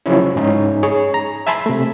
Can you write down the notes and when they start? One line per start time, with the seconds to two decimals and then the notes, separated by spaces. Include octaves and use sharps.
0.06 C#3 F3 F#3 C#4 E4
0.36 G#2 C#4 D#4
0.83 G#4 C#5
1.14 A#5
1.47 E5 G#5 A5 B5 C6
1.66 C3 A3